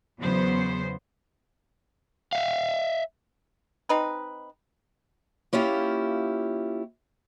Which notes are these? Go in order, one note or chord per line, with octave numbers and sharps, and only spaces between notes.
E2 C#3 F#3 B3 C5
E5 F5
C4 D#4 B4
A#3 C#4 E4 F4 G4